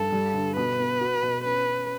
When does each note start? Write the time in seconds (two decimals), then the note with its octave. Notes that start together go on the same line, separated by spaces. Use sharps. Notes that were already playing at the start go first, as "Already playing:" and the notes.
Already playing: G2 A4
0.12 G3
0.34 D3
0.56 B2 B4
0.79 B3
1.01 F#4
1.23 B2
1.44 C#4 B4
1.66 C#4